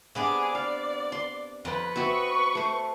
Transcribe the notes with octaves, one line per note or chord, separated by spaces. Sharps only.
C3 B3 D4 G#4 D6
D5 F5
C6
F2 B4
B3 C4 F#4 E5 C#6
A3 C5